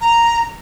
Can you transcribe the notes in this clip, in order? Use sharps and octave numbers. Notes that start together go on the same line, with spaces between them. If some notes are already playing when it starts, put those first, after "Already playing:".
A#5